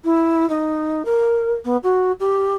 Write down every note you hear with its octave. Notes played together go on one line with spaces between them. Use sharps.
E4
D#4
A#4
B3
F#4
G4